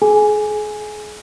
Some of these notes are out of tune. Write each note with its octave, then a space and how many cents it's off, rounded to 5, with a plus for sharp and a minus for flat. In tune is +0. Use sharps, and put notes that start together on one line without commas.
G#4 +35 G#5 +0